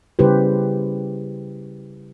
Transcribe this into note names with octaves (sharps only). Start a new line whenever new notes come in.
C#3 G3 E4 G4 B4 C5